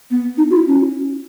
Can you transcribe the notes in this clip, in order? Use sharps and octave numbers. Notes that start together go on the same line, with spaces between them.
B3
D#4
F#4
E4
C#4